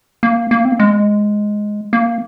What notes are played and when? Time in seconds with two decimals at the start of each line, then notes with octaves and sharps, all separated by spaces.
0.23 A#3
0.51 A#3
0.65 C4
0.72 A#3
0.79 G#3
1.93 A#3